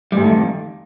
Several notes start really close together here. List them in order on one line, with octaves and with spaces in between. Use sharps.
G3 G#2 A3 D#3 F2